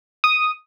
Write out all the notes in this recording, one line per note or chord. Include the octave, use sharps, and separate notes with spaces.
D#6